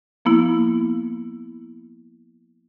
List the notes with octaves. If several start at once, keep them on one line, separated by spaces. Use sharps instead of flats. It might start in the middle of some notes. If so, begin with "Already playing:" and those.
F3 A#3 B3 E4